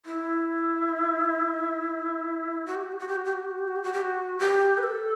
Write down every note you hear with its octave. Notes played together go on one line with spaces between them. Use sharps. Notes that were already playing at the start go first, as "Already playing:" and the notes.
E4
F#4
G4
F#4
G4
F#4
G4
F#4
G4
F#4
G4
F#4
G4
F#4
G4
F#4
G4
F#4
G4
B4
A4